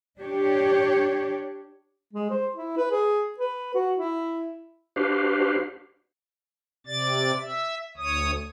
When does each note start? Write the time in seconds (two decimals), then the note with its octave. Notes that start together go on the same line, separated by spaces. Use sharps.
0.19 D4 G4 C#5
2.13 G#3
2.30 C5
2.55 E4
2.77 B4
2.91 G#4
3.38 B4
3.74 F#4
3.97 E4
4.96 D4 F#4 G4 B4 C5 F5
6.87 C3 D5 A6
7.40 E5
7.97 D2 C#5 D#6